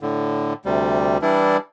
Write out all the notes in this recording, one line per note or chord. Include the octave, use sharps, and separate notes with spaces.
A2 D3
D2 C3 G3
E3 G3 D4 E4